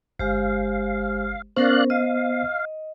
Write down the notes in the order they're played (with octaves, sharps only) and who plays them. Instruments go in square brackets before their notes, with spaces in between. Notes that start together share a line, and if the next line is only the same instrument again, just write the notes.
[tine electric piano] G1 [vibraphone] G#3 G4 C5 [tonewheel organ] F5
[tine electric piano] B3 C5 [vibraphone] C#4 A#4 [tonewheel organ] D5 F5 F#6
[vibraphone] D#5 [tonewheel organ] F5